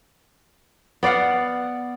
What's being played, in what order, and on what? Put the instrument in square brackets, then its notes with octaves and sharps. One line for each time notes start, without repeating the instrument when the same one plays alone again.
[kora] B3 D5 F5 F#5